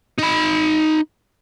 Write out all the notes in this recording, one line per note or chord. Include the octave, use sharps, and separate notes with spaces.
D#4 B5